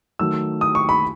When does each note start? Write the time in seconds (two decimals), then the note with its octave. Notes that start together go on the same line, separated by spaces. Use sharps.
0.19 D#3 F#3 A3 E6
0.61 D#6
0.75 C#6
0.89 B5